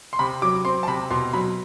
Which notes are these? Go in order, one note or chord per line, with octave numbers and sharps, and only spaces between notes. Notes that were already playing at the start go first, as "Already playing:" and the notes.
C6
C3 B5
F#3 D6
C4 C6
A5
C3 B5
B2 C6
F#3 B5